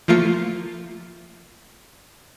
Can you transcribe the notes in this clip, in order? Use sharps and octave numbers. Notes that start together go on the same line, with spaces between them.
F3 A3 A#3 F4 C#7